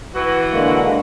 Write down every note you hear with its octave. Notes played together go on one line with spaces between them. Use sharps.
E3 F#4
D3 G#3 A#3